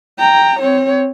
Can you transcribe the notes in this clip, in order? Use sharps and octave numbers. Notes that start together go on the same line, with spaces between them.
G5 A#5
C4 C#5